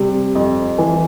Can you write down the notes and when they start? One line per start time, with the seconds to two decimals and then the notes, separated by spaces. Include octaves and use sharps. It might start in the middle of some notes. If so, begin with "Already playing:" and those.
Already playing: C3 G3
0.35 F2
0.78 E3